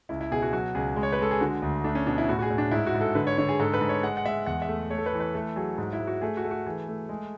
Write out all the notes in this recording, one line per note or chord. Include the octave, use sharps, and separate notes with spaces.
C#2 E4
E4
B2 G#4
F#4
F#3 F#4
C#2 G#4
G#3
C#5
B4
G#3 A4
G#4
D3 F#4
D2
A3 D4
C#4
B2 D4
E4
A2 F#4
F#4
G#4
A2
D4
G#2 E4
F#4
G#2
A4
D3 B4
C#5
D3 C#5
G#4
G#2 A4
B4
G#2
C#5
G#3 F#5
F#5
G#3 E5
E2 F#5
E5
A3
A3 C#5
A4
B4
E3
B4
A3 A4
F#3 G#4
G#2
E4
G#2
F#4
A3 G#4
F#4
A3
F#4
E3 G#4
A3
G#3